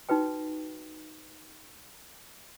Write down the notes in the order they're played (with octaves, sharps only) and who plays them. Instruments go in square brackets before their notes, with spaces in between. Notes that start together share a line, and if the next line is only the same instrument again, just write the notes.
[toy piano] D#4 F#4 B4 G5